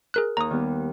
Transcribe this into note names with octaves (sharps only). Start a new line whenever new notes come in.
G#4 A#4 F#6
D#2 A#5 D#6
D#3 G3 B3